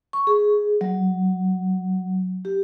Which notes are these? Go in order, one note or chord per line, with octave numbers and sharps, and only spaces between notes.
C#6
G#4
F#3
G4